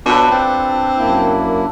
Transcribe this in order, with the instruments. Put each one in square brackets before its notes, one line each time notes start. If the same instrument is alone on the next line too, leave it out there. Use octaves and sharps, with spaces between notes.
[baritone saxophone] B2 [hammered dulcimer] D4 A4 B4 [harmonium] F4
[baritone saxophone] C4
[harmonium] F#2 A#3 E4